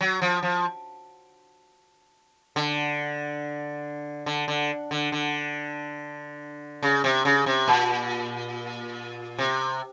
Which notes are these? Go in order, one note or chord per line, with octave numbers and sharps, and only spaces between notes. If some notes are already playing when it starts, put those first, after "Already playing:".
F#3
F3
F3
D3
D3
D3
D3
D3
C#3
C3
C#3
C3
A#2
C3